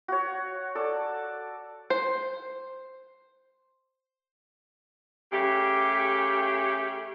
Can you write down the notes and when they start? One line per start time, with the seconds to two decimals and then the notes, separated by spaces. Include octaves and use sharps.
0.08 F#4 C#5
0.75 A4 D5
1.90 C5
5.32 C#3 A3 G4